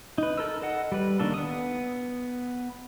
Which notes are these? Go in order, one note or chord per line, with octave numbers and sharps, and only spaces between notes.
D#4 B4
A4 A#4 E6
A4 D#5 F#5
G3 B4
D#3 A#3 D4 A4
B3 D#6